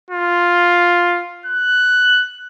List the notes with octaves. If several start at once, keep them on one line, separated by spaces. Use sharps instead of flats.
F4
F#6